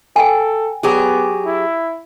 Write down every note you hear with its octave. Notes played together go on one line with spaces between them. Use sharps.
A4 G5 G#5
F#3 B3 G4 G#4
E4